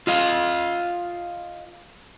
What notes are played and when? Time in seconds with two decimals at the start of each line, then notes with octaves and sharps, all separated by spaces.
0.07 F4 D#5 F5